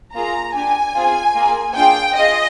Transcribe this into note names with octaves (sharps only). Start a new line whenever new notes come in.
A#3 F4 G#4 A#5
D4 G4 G#5
C4 F4 G#4
A#3 F4 G#4
D4 F4 G#4 G5
F4 G#4 D#5